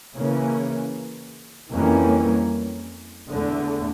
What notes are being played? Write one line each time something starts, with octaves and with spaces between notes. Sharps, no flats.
C#3 E3 A#3 C#4
F2 E3 G3 A#3 C#4
E2 D3 A3